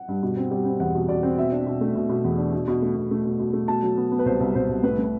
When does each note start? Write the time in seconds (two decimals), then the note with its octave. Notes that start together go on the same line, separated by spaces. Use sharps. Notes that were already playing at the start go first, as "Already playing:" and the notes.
Already playing: F#5
0.08 G2
0.22 B2
0.37 C4
0.51 G3
0.65 C4
0.80 E2 F#5
0.95 B2
1.08 B2 D5
1.23 C4
1.37 B2 E5
1.52 D4
1.66 B2
1.81 A3
1.95 B2
2.09 B2
2.24 E2
2.38 D4
2.52 B2
2.68 B2
2.82 A3
2.96 B2
3.11 A3
3.25 B2
3.40 B2
3.53 A3
3.68 B2 A5
3.83 F#3
3.97 B3
4.11 B3
4.19 B4
4.26 C2 C5
4.40 C2
4.55 C2 C5
4.69 C2
4.83 A2 B4
4.98 A2
5.03 B4